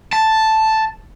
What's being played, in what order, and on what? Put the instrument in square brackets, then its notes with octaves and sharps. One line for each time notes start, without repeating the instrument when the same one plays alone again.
[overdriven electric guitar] A5